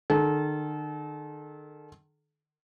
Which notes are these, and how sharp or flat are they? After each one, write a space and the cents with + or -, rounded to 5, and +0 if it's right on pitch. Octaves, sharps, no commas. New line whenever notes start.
D#3 -45 A4 -35